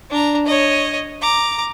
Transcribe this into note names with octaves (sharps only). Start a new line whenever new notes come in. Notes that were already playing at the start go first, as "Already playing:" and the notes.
D4 A#5
C#5 D#5
A#5 D6